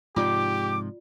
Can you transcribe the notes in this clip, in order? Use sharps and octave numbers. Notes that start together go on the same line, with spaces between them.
G#2 C3 F3 F4 G4 D5 D6